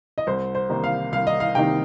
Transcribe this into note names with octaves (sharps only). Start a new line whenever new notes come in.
D#5
C2 C5
C5
C3 D#3 A#3 D#4
F5
C2 F5
D#5
F5
C3 D#3 A#3 D#4 G5